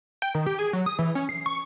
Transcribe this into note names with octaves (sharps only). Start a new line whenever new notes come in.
G5
D#3
G4
G#4
F#3
D#6
E3
C#4
C7
C#6